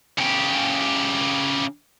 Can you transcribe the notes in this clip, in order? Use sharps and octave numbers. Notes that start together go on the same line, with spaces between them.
C#3 G4